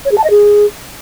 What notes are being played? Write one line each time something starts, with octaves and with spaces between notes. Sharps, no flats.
C#5
G#4
A5
D#5
G#4